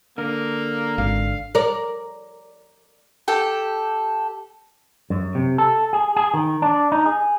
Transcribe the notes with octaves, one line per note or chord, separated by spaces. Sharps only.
D3 A#3 A#4
G#1 F5
A#4 D5
G4 A4 G5
F#2
C3
A4
G#4
G#4
D#3
D4
D#4
G#4